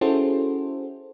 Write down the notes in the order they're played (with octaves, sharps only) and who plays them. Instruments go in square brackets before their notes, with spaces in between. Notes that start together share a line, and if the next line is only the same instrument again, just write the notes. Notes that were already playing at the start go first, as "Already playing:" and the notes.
[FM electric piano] C#4 E4 F#4 G#4 A4 C5